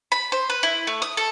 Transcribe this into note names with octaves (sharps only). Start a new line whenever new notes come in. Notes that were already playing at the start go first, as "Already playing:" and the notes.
B5
C5
B4
E4
A3
D#6
A4